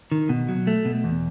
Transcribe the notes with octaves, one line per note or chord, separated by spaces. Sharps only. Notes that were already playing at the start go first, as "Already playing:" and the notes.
D#3
B2
F#3
A3
B2
E2